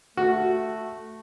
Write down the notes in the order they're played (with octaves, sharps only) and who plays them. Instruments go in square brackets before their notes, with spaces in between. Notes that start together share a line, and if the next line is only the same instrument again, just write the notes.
[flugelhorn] A3 [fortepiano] F#4